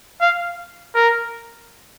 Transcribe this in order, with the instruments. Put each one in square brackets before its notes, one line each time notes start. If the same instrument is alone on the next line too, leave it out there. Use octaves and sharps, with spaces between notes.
[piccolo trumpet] F5
A#4